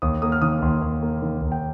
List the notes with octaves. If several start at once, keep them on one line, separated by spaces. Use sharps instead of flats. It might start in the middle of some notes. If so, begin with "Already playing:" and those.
D#2 D#6
A#3 D#6
F6
D#3 D#6
D#2 C6
D#2
A#3
D#3
D#2
G5